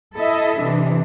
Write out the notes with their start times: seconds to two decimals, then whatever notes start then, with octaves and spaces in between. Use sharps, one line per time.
0.16 E4 A4 D#5 E5
0.62 C3 E3 D4